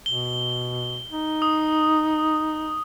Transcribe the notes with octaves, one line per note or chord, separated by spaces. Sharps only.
B2 G7
D#4
D#6